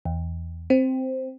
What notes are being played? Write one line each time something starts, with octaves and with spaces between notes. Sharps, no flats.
E2
C4